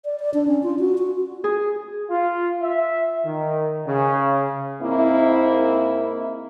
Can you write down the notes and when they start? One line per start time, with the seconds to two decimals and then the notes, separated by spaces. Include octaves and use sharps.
0.05 D5
0.19 D5
0.34 D4
0.48 C#4
0.63 F4
0.79 F#4
0.98 F#4
1.44 G#4
2.10 F4
2.62 E5
3.26 D#3
3.87 C#3
4.82 G#2 A#3 C4 E4